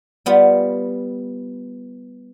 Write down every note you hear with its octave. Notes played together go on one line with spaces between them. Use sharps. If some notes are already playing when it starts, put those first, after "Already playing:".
G3 B3 F4